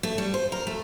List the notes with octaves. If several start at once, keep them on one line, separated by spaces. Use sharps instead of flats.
A3
G3
C5
A#4
A3